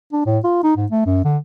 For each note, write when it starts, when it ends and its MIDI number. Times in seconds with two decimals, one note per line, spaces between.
0.13 0.24 62
0.26 0.39 45
0.44 0.62 65
0.64 0.73 63
0.77 0.86 44
0.92 1.04 57
1.06 1.19 42
1.25 1.37 50